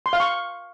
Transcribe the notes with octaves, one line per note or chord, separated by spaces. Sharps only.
C6
F5
C#6